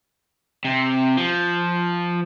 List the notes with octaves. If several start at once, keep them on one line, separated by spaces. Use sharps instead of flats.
C3
F3